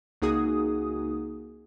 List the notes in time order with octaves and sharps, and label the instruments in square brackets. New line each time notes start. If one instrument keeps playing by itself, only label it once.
[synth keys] C#2 A#3 D#4 F#4 G#4 D#6